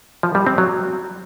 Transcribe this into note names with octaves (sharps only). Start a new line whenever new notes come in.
F3
G3
C4
F#3